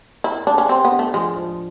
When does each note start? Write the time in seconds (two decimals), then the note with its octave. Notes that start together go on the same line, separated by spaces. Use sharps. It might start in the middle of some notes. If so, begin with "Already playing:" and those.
0.24 E4 A#4
0.47 A3 D4
0.58 C#4
0.69 C4 G4
0.85 B3
0.91 D4
0.99 A3
1.14 F3 G#3
1.36 F3